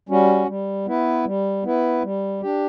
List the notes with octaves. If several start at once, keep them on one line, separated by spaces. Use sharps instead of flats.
G3 C#4 F#4
G3
B3 E4 B4
G3
B3 E4 B4
G3
D4 G4